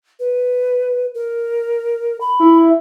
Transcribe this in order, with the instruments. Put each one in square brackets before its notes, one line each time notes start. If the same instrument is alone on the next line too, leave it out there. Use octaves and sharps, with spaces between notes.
[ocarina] B4
A#4
B5
[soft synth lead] E4